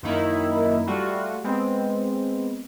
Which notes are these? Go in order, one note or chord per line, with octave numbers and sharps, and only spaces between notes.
F#2 D#3 A#3 D#4 E4
G3 A3 F4 F#4
G#3 B3 C4